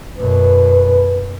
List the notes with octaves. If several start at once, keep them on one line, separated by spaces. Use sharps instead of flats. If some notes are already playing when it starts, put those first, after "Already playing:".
F#2 B2 B4